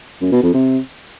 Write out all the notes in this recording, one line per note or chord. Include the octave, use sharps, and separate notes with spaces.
F#2
B2
F2
C3